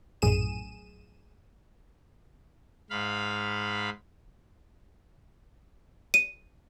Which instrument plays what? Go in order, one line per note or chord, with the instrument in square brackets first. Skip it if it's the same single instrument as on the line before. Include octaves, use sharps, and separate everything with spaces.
[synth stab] A#1 F#2 A2 G#4 D#7 E7
[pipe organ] G#2 F5 B5
[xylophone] D#7